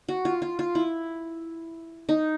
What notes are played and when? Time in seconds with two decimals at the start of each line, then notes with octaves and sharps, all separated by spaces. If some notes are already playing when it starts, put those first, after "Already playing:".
0.08 F#4
0.25 F4
0.42 F4
0.59 F4
0.75 E4
2.09 D#4